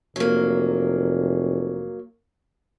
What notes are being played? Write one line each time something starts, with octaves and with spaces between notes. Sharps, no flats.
F1 F#3 A#3